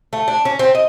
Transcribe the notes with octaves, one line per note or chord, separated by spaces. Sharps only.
A3
D4
C#4
C4
D#5